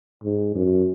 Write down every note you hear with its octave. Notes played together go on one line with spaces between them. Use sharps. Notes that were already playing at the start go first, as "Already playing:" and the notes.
G#2
F#2